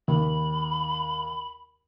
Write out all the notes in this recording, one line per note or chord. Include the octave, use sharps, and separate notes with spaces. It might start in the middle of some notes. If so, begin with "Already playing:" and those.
D#2 B5